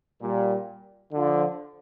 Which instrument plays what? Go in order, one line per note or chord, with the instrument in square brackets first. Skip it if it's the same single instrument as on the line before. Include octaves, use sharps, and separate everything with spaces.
[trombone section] A#2 G3
D3 F3